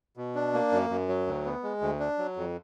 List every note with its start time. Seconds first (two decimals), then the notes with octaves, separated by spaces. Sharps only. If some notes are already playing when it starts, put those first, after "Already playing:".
0.17 B2
0.35 D4
0.54 A#3
0.71 F#2
0.90 F#2
1.08 F#3
1.27 D2
1.45 B3
1.63 G#3
1.81 D2
1.99 D4
2.18 F#3
2.37 F2